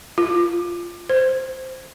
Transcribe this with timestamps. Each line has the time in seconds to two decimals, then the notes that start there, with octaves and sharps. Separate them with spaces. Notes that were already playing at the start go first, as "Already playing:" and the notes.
0.18 F4
1.10 C5